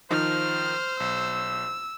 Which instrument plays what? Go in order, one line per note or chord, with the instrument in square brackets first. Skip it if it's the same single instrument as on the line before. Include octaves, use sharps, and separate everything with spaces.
[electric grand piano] D#3 F3 D#4 [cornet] C5 [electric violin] F6
[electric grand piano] B1 [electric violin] E6